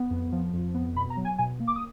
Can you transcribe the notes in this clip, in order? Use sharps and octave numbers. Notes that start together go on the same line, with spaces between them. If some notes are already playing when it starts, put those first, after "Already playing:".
Already playing: B3
F2
F3
F2
B3
B2 B5
A#5
F#3
G#5
B2 G#5
A#3
D6
D#6